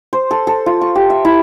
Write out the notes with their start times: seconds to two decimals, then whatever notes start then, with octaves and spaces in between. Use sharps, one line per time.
0.13 C5
0.31 A4
0.47 A4
0.66 F4
0.81 C#6
0.95 G4
1.10 E5
1.25 E4